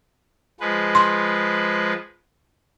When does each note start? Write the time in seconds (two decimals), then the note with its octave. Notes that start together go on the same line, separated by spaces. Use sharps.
0.60 F3 G#3 B4
0.95 C6